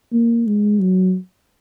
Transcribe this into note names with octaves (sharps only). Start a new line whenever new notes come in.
A#3
G#3
F#3